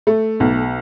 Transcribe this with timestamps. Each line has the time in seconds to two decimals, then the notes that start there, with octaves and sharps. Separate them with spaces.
0.07 A3
0.40 B1